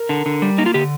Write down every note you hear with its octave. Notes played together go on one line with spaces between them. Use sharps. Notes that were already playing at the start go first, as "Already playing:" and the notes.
Already playing: A#4
D3
D3
G3
A#3 D#4
F4
D3 G4